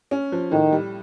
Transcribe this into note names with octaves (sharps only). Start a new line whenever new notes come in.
C#4
F3
A2 D#3
G3